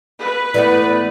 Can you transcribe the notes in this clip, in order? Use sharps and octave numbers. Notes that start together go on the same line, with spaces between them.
B4
E3 A3 B3 D5